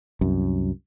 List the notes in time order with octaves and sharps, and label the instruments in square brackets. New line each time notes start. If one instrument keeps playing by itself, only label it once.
[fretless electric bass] C2 F#2